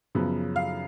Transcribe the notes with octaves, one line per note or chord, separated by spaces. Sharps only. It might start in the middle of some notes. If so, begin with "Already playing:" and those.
F#2 C#3 F3 B3
F5